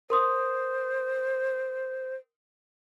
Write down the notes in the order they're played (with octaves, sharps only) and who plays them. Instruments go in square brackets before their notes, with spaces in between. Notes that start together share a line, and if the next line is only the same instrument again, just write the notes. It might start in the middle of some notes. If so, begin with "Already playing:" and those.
[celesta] A#4 C6 D#6 [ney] C5